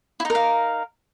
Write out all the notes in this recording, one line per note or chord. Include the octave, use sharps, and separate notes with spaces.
D#4 E4 A#4 F5